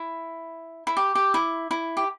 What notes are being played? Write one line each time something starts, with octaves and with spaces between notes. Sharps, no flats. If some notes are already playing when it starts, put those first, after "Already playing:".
Already playing: E4
E4
G4
G4
E4
E4
G4